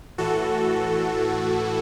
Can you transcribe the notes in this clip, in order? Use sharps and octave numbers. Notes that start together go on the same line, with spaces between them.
A2 E3 F#4 A4